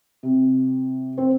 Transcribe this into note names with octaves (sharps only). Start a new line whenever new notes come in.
C3
C4